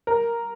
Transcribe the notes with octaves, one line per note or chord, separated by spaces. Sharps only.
A#4